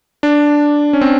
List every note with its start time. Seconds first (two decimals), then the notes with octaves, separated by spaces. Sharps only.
0.23 D4
0.93 C#4
1.01 C4